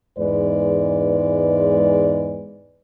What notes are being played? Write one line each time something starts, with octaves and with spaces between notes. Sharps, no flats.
E2 G#2 G#3 B4 D5